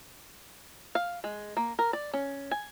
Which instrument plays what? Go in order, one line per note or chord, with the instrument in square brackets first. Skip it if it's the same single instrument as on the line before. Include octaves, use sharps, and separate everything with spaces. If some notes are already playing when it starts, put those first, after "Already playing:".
[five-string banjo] F5
G#3
A#3
A#4
D5
C#4
G#5